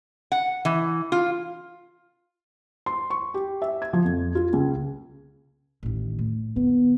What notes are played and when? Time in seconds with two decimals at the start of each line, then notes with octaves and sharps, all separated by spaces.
0.32 F#5
0.65 E3
1.12 F4
2.86 C6
3.10 C#6
3.34 G4
3.62 E5
3.82 G#6
3.93 F3
4.05 F2
4.35 F4
4.53 C#2
5.83 A1 D#3
6.19 A2
6.56 D3 B3